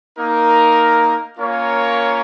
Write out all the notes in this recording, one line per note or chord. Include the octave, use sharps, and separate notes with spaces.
A#3 D#4 A#4
A#3 C#4 F4 A#4 C#5